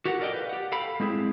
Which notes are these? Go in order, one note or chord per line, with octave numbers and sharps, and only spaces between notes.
F#4 G4 A4 A#4 F#5
A4 A#4 D5 D#5 F#5 G5
B4 F5
G4 F#5
A4 F5 G5 B5
G#3 C4 E4 G#4